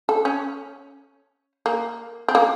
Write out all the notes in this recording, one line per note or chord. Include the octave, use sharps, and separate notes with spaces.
A4
C#4
A#3
C4
A#3